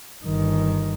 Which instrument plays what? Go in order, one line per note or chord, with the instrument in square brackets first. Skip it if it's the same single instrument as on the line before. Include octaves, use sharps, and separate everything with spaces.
[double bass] G1 D#3